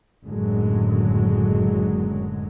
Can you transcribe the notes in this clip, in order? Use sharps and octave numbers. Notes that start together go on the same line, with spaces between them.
F#1 F#2 A2 D3 F#3 G#3